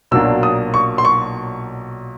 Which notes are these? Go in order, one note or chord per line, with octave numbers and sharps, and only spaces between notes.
B1 A#2 F#3 A#3 D4 E6
D#6
C#6
C6
C#6